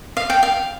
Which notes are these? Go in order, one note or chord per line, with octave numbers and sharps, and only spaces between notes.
F5
G5
F5